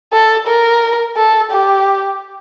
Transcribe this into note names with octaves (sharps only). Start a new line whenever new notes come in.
A4
A#4
A4
G4